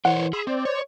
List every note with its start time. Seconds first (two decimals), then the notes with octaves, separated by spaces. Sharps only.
0.05 E3 A#4 C5 C#5 F#5
0.33 G#4 B5 C6 E6
0.47 C4 C5 D5
0.65 C#5